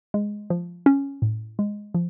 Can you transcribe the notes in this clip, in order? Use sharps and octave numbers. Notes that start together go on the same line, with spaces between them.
G#3
F3
C#4
A2
G#3
F3